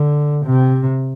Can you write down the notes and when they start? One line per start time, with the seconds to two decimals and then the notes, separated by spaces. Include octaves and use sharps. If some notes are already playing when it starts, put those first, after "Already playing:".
Already playing: D3
0.45 C3